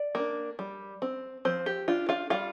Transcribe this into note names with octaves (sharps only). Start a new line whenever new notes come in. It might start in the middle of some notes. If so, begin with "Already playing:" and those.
Already playing: D5
A#3 D4
G3
C4
F3 C4 C5
G4
D4 F4
F4 F5
G3 F4 F5